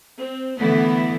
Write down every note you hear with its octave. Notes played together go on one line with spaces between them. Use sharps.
C4
D3 E3 A3 B3 E4